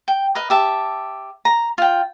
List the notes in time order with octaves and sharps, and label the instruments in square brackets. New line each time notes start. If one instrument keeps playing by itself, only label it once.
[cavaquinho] G5
A#4 B4 D#5
G4 E5 A5
A#5
F4 G5